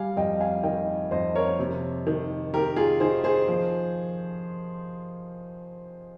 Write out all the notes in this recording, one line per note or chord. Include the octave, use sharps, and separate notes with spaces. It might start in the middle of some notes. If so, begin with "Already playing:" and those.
Already playing: G3 F5 G#5
F2 D#5 G5
F5 G#5
D#3 D#5 G5
F2 C5 D#5
A#4 C#5
C3
D#3
D#3 G4 A#4
F4 G#4
D#3 G#4 C5
G#4 C5
F3